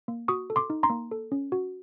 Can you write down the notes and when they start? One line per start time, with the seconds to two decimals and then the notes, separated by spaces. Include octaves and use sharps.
0.08 A#3
0.28 F#4 C#6 D#6
0.50 A4
0.56 C6 D6
0.70 D#4
0.83 A#5 C6
0.90 A#3
1.11 A4
1.32 C#4
1.52 F#4